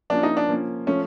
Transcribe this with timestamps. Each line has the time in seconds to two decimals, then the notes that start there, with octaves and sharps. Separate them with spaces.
0.10 F3 A#3 C#4 D4
0.23 D#4
0.37 D4
0.49 F3 A#3 C#4
0.87 F3 A3 C#4